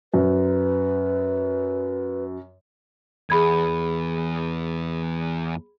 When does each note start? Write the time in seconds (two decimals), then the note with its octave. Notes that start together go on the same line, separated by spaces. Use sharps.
0.14 F#2 B4
3.30 E2 G#4 B5 G#6